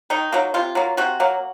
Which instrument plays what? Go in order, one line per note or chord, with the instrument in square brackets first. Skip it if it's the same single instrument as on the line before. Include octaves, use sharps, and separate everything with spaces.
[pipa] D#3 D#4
F#3 A#3
C3 F4
F#3 A#3
C3 F#4
F#3 A#3